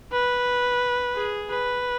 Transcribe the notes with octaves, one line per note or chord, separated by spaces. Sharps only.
B4
G#4
B4